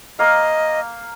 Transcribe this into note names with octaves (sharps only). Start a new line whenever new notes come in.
A#3 D#5 F5